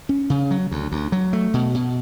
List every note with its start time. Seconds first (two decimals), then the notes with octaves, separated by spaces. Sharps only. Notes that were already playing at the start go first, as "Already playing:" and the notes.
0.09 C#4
0.30 C#3
0.51 F#3
0.71 D2
0.92 D2
1.12 F#3
1.33 A3
1.54 B2
1.75 B2